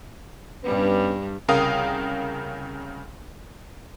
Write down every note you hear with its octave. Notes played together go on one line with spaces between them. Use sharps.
G2 G3 B3 C#4 B4
C2 C#3 A#4 F5 G5 D#6